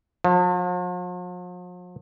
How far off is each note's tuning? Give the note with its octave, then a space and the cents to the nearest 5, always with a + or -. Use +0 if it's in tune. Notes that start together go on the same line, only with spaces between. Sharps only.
F3 +45